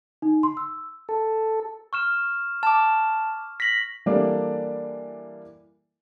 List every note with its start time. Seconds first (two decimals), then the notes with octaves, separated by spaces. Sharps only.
0.22 D#4
0.43 C6
0.57 E6
1.09 A4
1.93 C#6 F6 E7
2.63 A5 D6
3.60 A#6 B6 F#7
4.06 E3 G3 A#3 D4 A4 D5